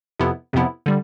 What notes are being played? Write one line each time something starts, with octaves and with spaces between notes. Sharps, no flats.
F2 C3 F3 B3 E4
F2 C3 F3 B3 E4
D3 G3